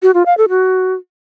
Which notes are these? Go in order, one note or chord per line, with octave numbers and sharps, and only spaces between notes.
F#4
F4
F5
A4
F#4